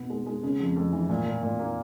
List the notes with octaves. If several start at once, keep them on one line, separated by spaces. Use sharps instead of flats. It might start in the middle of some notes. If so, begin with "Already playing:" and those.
Already playing: B2 B3
G#3
G#3
C#3
F2
F2
E3
A#2
A#2
A#2
A#3